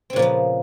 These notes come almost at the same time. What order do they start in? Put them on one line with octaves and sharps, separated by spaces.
C4 C#3 A#2 F3 B3